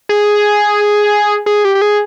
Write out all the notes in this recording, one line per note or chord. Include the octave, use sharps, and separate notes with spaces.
G#4
G#4
G4
G4
G#4